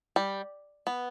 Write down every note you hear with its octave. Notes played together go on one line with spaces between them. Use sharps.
G3
B3